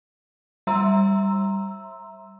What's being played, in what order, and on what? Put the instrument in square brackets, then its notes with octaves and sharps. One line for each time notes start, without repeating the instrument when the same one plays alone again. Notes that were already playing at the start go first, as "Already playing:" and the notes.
[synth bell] G3 E5 A#5 C6 E6